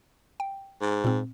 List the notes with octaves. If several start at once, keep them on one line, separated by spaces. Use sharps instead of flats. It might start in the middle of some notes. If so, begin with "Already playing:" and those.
G5
G#2
A#2 C4